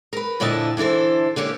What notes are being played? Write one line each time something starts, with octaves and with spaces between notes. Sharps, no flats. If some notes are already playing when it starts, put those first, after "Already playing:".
A#4 B4
F2 A#2 D3 E4 D#5 A5
D3 E3 E4 A4 C5
D3 A#3 C#4 G4